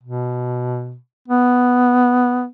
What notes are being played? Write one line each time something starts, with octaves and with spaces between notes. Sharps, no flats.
B2
B3